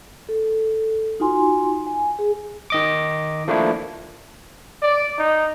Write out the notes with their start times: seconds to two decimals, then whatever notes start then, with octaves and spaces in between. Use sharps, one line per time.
0.29 A4
1.20 D#4 F4 F#4 G#5 C6
1.87 G#5
2.19 G#4
2.70 D#3 D#5 D6
3.48 F3 A3 A#3 D4 E4
4.82 D5
5.18 D#4